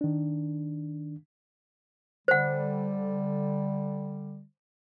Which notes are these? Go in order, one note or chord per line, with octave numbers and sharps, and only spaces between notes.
D#3 D4
D3 G3 C5 F#5